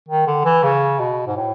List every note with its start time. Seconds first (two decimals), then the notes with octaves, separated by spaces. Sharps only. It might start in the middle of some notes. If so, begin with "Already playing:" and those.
0.08 D#3
0.27 D3
0.45 E3
0.64 C#3
1.00 B2
1.27 G#2
1.36 A2